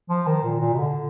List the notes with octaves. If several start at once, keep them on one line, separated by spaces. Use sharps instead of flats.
F3
D#3
A#2
A#2
B2
D3